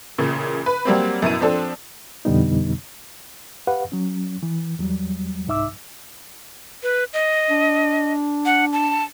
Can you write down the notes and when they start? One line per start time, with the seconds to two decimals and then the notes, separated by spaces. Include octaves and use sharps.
0.18 A1 A#2 C#3
0.66 B4
0.85 F#3 G3 A#3 C4
1.22 F#2 B2 E4 D#7
1.40 F3 C4 D4 A4
2.25 F2 B2 D3 G3 B3 D#4
3.67 G4 B4 F5 F#5
3.92 F#3 C#4
4.43 E3
4.79 E2 F#3 G3
5.47 C2 G#2 D#4 E5 D6 E6
6.83 B4
7.13 D#5
7.49 D4
8.45 F#5
8.73 A5